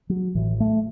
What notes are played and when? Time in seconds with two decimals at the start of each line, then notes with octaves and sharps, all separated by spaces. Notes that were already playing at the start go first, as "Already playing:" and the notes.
0.09 F#3
0.35 A1 A2 E3
0.60 A3